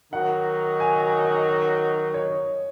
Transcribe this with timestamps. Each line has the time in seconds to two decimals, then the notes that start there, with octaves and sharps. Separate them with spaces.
0.13 D#3 F#3 D#4 F#4 F#5
0.80 G#5
1.02 G#5
1.25 D#5
2.14 C#5